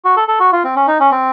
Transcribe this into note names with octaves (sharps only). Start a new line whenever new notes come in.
F#4
A4
A4
F#4
F4
C4
C#4
D#4
C#4
C4